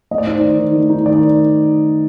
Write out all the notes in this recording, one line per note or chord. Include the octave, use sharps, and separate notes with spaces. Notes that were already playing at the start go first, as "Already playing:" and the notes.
A3 D#5
D5
D#4 C5
D5
D#3
D#3
A3
D#4
D#3 D5